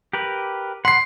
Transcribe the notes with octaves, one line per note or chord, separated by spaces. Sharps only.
G4 A#4 B4
F#5 B5 C6 C7